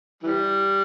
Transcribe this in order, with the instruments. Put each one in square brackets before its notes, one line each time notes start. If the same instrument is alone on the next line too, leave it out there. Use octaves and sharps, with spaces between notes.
[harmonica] E3 G3